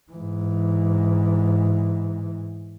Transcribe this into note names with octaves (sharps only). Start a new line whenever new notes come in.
G#2 E3